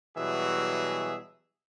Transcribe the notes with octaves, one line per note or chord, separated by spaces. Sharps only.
B2 E3 F#3 G3 G#4 E5